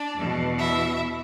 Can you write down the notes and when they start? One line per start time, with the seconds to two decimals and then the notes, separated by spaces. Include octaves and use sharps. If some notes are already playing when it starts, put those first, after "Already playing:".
Already playing: D4 D5
0.14 E2 B2
0.58 E4 E5